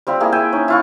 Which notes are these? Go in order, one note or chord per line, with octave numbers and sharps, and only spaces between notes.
G3 C4 F4 B5
A#3 E4 G#4
E5 G5 G#5
C#4 D#4
E4 F4 C#6